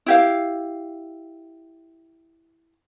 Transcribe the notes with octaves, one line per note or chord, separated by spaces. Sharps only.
E4 G4 F5